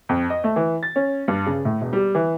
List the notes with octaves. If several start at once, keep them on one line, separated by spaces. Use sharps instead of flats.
F2
D#5
A3
E3
A6
C#4
G2
C#3
A2
E1
G3
E3